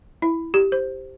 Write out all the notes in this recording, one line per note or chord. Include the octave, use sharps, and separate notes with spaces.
E4
G4
C5